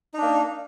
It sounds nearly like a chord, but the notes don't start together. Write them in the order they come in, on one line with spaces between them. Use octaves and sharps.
D#4 D4 A#3